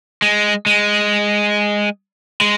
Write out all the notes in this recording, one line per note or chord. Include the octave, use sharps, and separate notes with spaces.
G#3
G#3
G#3